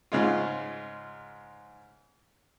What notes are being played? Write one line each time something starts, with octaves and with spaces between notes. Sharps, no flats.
G#2 C#3 G#3 F4